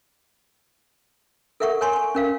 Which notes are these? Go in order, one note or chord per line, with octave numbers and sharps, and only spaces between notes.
A4 A#4 E5 F#5 C#6
A#4 C#5 G#5 C6 C#6
G#5 C#6
C#4 A#4 F5